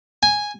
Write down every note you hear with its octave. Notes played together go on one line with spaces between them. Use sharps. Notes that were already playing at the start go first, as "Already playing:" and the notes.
G#5